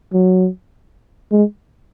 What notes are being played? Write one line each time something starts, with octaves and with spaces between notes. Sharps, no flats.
F#3
G#3